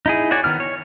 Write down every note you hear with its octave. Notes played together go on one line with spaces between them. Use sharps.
D#4 E4 G#4
F#4 C#5 D5 G#5
D#3 B3 F6
C#5